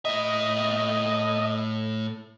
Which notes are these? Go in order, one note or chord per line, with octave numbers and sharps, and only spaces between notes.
A2 D#5 E5